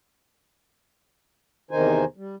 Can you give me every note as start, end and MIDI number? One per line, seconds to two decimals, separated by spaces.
1.71 2.05 40
1.71 2.05 48
1.71 2.05 51
1.71 2.05 63
1.71 2.05 72
1.71 2.05 80
2.17 2.35 55